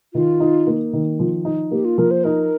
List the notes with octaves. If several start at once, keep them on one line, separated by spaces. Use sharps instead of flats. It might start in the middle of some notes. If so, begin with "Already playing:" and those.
D#3 F4
D#4
A#3
D#3
F3
D#4
A#3 G4
F4
F3 A#4
C5
D#4 A#4